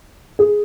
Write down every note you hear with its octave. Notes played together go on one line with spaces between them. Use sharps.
G#4